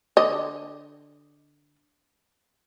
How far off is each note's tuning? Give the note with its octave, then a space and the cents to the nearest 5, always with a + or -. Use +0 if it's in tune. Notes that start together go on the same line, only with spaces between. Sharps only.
D3 +0 D#5 +0